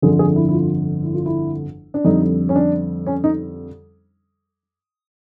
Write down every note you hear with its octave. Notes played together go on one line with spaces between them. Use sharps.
G1 F2 D3 F3 G#4
G#4
E4
E4
F4
E4
F4
E4
D4
F2 D3 G3 D#4
C#4
D4
C#4
D#4